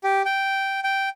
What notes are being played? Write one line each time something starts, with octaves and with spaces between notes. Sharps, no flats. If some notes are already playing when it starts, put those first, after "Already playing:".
G4
G5
G5